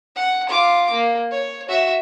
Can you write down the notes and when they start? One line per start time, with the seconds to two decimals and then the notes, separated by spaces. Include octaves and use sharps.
0.16 F#5
0.49 F4 D6
0.91 A#3
1.31 C#5
1.69 F#4 E5